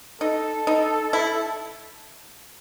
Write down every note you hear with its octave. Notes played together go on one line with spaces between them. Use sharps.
D#4 A4
D#4
E4